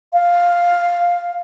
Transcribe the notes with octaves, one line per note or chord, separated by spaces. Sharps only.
F5